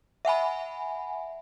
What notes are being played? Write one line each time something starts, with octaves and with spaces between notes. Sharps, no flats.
E5 F#5 G#5 B5